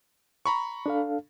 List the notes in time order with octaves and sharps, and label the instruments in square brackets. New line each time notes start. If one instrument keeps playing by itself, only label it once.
[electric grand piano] A#5 B5 C#6
[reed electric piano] D4 A4 F5